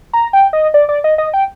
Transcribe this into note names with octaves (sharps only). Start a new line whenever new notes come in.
A#5
G5
D#5
D5
D5
D#5
D#5
G5